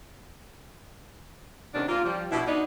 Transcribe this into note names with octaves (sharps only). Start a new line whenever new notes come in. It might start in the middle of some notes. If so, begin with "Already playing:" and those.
A2 C3 D#3 B3 C#4 D4
A#3 F4
F3 G3
B2 D4 E4
B3 D4 D#4